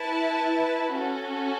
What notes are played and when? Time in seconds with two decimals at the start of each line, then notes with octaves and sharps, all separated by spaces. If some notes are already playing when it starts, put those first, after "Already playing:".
Already playing: E4 B4 A5
0.93 C#4 F#4 A4